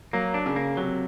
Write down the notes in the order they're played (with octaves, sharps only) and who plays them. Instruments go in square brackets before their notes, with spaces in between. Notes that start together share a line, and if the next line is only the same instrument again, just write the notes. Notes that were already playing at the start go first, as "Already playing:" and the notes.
[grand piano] F#3 [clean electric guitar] A#3
[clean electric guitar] D4
[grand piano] C#3
[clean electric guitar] A#3
[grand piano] C3 [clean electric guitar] F#3